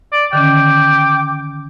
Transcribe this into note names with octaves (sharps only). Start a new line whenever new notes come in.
D5
D3 D#3 C#4 G5 D6